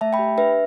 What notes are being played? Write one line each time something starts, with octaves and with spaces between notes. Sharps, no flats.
A3 E5 A5
G5 B5
G4
D4 B4 E5